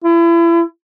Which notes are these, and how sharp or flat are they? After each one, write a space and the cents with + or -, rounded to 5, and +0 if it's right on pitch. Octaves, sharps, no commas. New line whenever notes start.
E4 +35